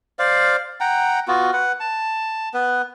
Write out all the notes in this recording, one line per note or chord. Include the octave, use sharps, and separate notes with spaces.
C5 D5 F5
F#5 G5 A#5
B3 F4 F#4
B4 F#5
A5
B3 B4